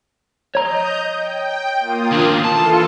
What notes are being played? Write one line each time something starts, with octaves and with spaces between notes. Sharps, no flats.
C#5 D#5 A#5 G6
G5
A#3 F4 D#6
D#2 D4
E3 F4 A4 A5